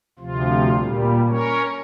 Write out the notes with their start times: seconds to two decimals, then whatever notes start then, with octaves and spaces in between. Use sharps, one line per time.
0.19 D2 C3 F3 F4
0.76 A#2 G3
1.29 C#4 A#4 C#5